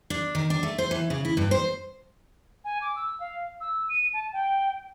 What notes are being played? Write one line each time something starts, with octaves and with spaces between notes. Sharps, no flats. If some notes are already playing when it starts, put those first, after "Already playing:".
D4
D#3
D4
A3
C5
E3
C#3
E4
G2
C5
G#5
D6
E6
F5
E6
D#7
A5
G5